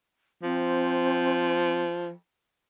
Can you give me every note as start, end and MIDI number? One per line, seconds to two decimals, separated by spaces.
0.43 2.12 53
0.43 1.82 60